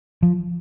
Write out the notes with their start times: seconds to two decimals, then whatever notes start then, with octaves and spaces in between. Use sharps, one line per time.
0.23 F3